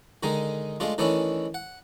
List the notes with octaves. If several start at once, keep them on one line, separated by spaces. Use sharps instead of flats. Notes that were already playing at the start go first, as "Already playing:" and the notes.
D3 D#3 G#3 D#4
G#3 A3 D4 F4
D#3 E3 A3 C#4 D4 E4
F#5